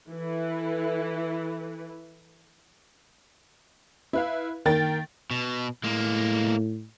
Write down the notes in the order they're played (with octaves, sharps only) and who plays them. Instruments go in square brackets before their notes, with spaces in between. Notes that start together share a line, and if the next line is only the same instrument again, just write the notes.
[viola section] E3 E4 A4 B4
[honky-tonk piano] E4 B4 F5
D#3 A#3 A#4 G5 A6
[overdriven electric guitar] B2
[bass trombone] A2 [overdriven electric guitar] G#3 A#3